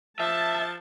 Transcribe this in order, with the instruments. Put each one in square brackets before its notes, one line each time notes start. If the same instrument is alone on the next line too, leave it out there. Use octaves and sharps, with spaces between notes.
[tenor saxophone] F3 [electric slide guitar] E5 [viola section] A5